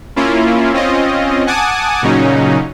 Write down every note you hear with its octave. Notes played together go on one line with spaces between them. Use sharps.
A#3 C#4 E4 F4
C4 C#4 F4 D#5
F#5 G#5 A5 D6 D#6
A#2 C#3 F#3 C#4 D#4